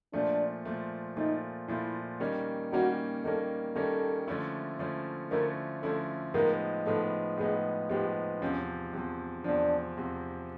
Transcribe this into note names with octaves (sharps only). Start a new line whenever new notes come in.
A#2 F3 A3 D4
A#2 F3 A3
A#2 F3 A3 D#4
A#2 F3 A3 E4
D#3 G3 A#3 C#4
D#3 G3 A#3 C#4 F#4
D#3 G3 A#3 C#4 A4
D#3 G3 A#3 C#4 A4
D3 F3 A3 C#4 E4
D3 F3 A3 C#4 E4
D3 F3 A3 C#4 E4 A#4
D3 F3 A3 C#4 E4 A4
A2 F3 G#3 B3 D#4 A#4
A2 F3 G#3 B3 D#4 A4
A2 F3 G#3 B3 D#4 G#4
A2 F3 G#3 B3 D#4 G4
E2 C3 F3 C#4
E2 C3 F3
E2 C3 F3 D4
E2 C3 F3